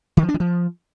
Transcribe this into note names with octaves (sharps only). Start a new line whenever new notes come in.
D#3
F3
D4
E3
F3